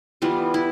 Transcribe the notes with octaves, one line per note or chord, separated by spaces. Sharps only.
E3 G3 B3 F4
E4